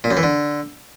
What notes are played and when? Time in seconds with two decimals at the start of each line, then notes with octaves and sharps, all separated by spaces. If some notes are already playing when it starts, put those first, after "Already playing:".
0.04 A#2
0.11 F#2
0.17 E3
0.23 D3